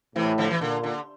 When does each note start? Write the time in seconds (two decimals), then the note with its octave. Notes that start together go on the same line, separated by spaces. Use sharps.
0.16 A2 C3 E3
0.38 D3 F3
0.51 E3
0.61 A#2 D3
0.83 D3